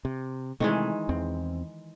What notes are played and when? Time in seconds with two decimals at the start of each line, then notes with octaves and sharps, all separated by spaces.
0.05 C3
0.60 C3 D#3 E3 G#3 A3
1.09 E2 C4